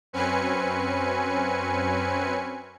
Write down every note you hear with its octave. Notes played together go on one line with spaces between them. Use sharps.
F#2 C4 C#4 B4 G#5 C#7